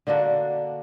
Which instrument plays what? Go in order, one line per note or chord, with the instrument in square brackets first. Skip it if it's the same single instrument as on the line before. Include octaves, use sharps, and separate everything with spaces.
[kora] D3 A#3 D4 F#4